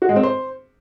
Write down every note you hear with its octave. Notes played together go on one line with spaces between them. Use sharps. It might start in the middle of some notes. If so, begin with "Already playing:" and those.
F#4
G#3
C4
C5